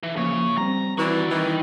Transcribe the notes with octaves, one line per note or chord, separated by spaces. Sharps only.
E3
C#3 F3 A#3 C#5
G3 C4 A#5
E3 F#4 D5
D#3 E3 A#4